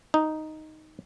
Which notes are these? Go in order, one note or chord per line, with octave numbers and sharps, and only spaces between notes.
D#4